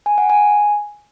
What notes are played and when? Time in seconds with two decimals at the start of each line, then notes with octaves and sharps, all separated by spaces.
0.06 G#5
0.18 F#5
0.30 G#5